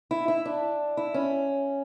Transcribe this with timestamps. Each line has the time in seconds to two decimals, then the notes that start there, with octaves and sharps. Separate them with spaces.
0.11 E4
0.28 E4
0.45 D4
0.97 E4
1.14 C#4